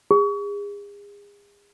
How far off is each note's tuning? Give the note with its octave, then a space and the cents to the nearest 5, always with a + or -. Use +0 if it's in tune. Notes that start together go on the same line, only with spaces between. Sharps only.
G#4 -35